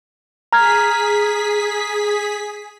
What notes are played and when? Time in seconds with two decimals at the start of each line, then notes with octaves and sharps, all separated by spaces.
0.53 G#4 A#5 F6 G#6 B6